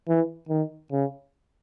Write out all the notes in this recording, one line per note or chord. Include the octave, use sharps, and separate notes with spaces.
E3
D#3
C#3